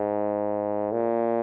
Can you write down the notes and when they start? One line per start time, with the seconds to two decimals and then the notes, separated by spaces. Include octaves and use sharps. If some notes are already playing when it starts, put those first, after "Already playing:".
Already playing: G#2
0.92 A#2